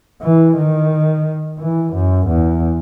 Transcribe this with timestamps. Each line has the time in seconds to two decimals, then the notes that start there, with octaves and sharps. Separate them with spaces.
0.22 E3
0.56 D#3
1.59 E3
1.93 F#2
2.27 E2